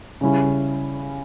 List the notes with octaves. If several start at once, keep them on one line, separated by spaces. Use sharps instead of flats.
C#3 G3 C#4 E4